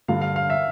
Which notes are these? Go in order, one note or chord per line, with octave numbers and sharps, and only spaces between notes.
G2 D3 G3 F5
F5
F5
E5